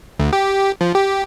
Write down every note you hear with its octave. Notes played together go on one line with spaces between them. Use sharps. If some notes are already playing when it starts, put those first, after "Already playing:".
D2
G4
F3
G4